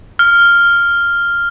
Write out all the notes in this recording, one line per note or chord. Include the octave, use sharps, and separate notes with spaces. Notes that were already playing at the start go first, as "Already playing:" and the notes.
F6